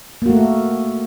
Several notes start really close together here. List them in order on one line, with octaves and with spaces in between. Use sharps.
A#3 F#4 A3